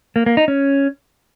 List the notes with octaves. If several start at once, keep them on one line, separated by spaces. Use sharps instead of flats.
A#3
A#3
D#4
C#4